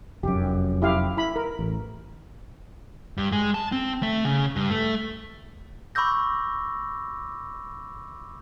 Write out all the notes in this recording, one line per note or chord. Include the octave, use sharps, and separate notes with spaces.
F1 F#2 G4
E4 G4 F5
E4 B5
A#4
A1
G2
G#3
A5
C4
A3
C#3
G2
A3
B5 C#6 D6 E6 G6 A#6